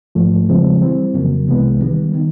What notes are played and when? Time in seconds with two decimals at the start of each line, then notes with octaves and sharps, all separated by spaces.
0.15 G#2 F3 A3
0.48 E2 C#3 F3 G#3 C4
0.81 E3 G3 C4
1.14 F2 C#3 F#3 A#3
1.47 C2 C3 E3 G#3 B3
1.80 D#3 G3 B3
2.15 D#3